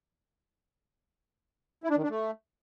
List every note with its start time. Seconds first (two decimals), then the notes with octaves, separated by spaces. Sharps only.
1.84 E4
1.90 D4
1.97 D#3
2.03 D4
2.10 A3